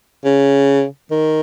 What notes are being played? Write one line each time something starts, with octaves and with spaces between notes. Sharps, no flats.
C#3
D#3